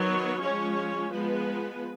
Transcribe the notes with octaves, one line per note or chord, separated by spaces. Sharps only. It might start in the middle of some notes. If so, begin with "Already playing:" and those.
Already playing: D#3 F#3 B3 C#5
F3 G#3 C#4 C#5
F3 G#3 B3 B4